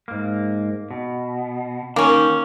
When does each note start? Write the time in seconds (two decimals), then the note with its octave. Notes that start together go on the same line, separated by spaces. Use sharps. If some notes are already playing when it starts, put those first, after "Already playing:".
0.08 G#2 A#3
0.91 B2
1.96 D#3 A#3 C#4